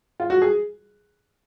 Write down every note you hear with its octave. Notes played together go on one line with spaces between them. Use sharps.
F4
F#4
G#4